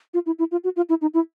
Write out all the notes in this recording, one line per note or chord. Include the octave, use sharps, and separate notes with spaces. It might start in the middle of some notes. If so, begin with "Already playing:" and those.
F4
E4
E4
F4
F#4
F4
E4
D#4
E4